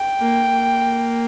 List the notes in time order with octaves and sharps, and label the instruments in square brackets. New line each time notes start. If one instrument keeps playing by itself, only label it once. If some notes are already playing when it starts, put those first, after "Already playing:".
Already playing: [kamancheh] G5
[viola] A#3
A#3